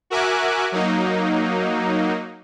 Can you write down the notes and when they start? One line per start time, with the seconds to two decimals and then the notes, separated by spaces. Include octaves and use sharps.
0.10 F#4 A#4 E5 G#5 D6 F#6
0.72 F#3 A#3 D#4